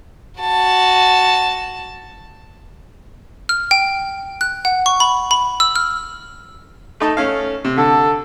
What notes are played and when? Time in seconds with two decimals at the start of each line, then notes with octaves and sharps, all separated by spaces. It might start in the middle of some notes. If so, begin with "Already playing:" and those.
0.40 F#4 A5
3.49 F6
3.71 G5
4.41 F#6
4.65 F#5
4.86 C#6
5.00 B5
5.31 B5
5.60 E6
5.76 F6
7.00 A3 D#4 A5
7.17 A3 C#4 F5
7.65 C3
7.78 D3 A4